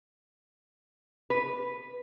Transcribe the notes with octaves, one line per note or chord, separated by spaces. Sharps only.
B4